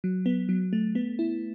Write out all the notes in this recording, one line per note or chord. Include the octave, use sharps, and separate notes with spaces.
F#3
B3
F#3
A3
B3
E4